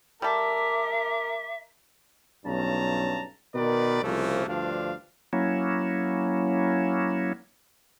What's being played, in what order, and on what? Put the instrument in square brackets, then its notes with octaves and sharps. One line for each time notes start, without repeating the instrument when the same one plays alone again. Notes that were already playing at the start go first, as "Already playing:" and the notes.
[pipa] G3 A4 [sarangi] A#4 [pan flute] E5 [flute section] D6
[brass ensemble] B1 G2 C#4 A5 A#5
B2 D#3 A#4 B4 D5
C2 C#3 F3 A3 A#3
D2 G2 F3 D4 F5
[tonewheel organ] F#3 A#3 C#4 E4